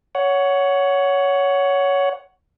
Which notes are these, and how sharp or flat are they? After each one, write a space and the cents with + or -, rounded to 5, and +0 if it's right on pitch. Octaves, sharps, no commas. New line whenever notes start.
C#5 +15 F#5 +0